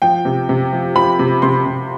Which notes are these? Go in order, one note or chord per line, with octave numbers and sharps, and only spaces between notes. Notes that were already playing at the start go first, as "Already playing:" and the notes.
F3 G5
C3
C3
F3
F3 B5
C3
C3 C6
C3